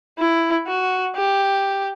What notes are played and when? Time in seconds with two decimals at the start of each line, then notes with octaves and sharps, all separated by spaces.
0.18 E4
0.67 F#4
1.16 G4